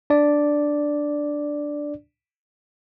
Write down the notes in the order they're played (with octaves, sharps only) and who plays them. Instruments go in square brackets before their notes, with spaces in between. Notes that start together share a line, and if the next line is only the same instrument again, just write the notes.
[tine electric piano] D4 D5